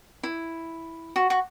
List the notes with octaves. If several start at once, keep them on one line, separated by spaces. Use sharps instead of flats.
E4
F#4
F#4